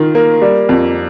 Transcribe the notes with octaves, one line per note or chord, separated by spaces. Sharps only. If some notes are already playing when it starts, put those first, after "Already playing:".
Already playing: D#3 F4
A#3
G3
F2